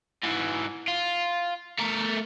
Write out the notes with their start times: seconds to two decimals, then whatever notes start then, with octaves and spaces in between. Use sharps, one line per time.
0.24 G#2 E3
0.88 F4
1.79 A3 A#4